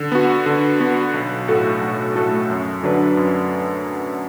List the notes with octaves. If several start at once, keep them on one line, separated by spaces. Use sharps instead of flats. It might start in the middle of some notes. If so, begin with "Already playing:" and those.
Already playing: D3
B3 F#4
D3
B3 F#4
B1
A2 A3 F#4 A4
B1
A2 A3 F#4 A4
F#2
D3 F#3 D4 B4
F#2